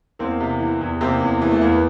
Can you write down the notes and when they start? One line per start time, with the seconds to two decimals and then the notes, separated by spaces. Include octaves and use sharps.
0.19 E2 A#3 C4
0.40 C3
0.60 E3
0.81 E2
1.01 C3 A#3 C4
1.21 E2
1.42 E3
1.51 A3
1.61 E2 A#3
1.72 B3